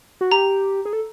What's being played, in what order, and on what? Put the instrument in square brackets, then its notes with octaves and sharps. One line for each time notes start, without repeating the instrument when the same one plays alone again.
[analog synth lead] F#4
[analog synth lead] G4 [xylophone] A#5
[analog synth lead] G#4
A4